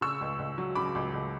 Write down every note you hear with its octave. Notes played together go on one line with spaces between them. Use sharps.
C#3 C#6 E6
C#2
C#2
F#3
C#3 B5 D6
C#2
C#2